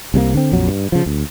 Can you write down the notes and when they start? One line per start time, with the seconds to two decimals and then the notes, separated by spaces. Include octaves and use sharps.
0.14 C2 C3 F#3 A#3
0.34 D3 C4
0.52 A#1 F2 F#3
0.68 G2
0.92 C#3 F3
1.06 D2